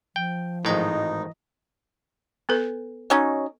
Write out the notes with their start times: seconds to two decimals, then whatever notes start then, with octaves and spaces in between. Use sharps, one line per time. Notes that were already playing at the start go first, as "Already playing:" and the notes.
0.16 F3 G5
0.65 G#1 A2 E3 D#4 D#5 A#5
2.49 B3 A4 B4
3.10 F#3 C#4 D#4